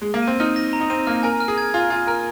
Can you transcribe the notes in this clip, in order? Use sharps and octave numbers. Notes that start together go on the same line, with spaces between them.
G#3
A#3
D#7
C4
D#4 F6
A#6
A#5
D#4
C4 D#7
A#3 F6
A#4 G#5
F6
G#4
G#6
F4 G#5
F4 G#5
A#4 F6